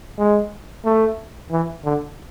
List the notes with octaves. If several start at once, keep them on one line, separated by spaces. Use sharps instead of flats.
G#3
A3
E3
D3